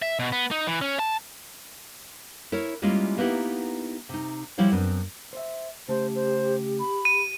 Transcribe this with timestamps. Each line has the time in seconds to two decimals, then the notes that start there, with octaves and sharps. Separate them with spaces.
0.02 E5
0.19 B2
0.32 B3
0.51 D#4
0.67 E3
0.82 C#4
0.99 A5
2.52 E4 A#4 C#5
2.82 G3 G#3 A#3 C#4 E4 F4
3.18 A#3 B3 D#4 E4 G4
4.09 C3 D#4
4.58 F3 G3 E4 F#4 C#5 F5
4.72 F#2 B3 C4 D4
5.33 C5 E5
5.89 C#3 A3 G4 C5 A5
6.15 C5
6.80 B5
7.05 D#7